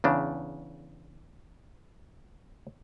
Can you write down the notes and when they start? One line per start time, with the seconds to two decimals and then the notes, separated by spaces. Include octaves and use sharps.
0.04 E2 C#3 D4